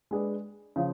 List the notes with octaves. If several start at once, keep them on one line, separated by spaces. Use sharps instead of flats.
G#3 D4 G#4 B4
C#3 F3